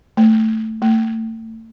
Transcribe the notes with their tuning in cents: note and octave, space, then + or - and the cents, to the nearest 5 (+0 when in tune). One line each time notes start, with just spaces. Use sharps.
A3 +5
A3 +35